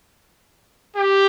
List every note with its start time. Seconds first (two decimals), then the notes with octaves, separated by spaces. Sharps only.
0.97 G4